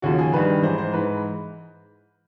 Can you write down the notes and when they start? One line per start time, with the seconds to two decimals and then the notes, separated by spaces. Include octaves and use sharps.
0.02 D#2 C#3 F3 F#4
0.19 G#4
0.33 G2 D#3 B4
0.62 G#2 E3 C5
0.78 C5
0.92 G#2 E3 B4